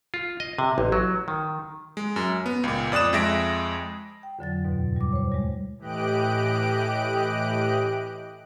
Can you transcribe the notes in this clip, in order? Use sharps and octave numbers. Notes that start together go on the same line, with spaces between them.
F4
D#5
C3
A1
F#3
D#3
G#3
F#2
B3
C#2 A#2
F2 D5 D#6 F#6 E7
F2 G#3 E5 A#6 D7
G5
F2 D3 F#3 A6
D#2 G#2 B2
G3 D6
C5 C#5
G3 G#3
A2 E3 G4 D#5 F#6 D7